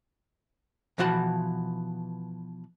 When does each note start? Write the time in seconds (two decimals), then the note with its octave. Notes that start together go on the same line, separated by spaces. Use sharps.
0.98 B2 E3 F3 F#4 A5 B5